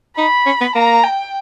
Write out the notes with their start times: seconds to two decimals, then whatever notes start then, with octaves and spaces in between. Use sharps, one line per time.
0.17 D#4 B5
0.46 C#4
0.61 B3
0.75 A#3 A#5
1.04 G5